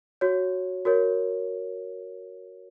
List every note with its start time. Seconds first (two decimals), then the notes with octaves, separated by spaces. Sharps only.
0.21 F#4 C#5
0.85 F#4 A#4 C#5